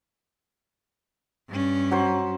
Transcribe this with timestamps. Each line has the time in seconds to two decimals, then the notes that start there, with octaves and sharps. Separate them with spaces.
1.49 G2 C#4
1.91 F#3 C5